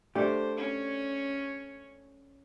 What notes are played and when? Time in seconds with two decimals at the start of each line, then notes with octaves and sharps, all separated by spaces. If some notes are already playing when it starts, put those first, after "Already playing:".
0.15 A3 D4 G4 C5
0.57 C#4 C#5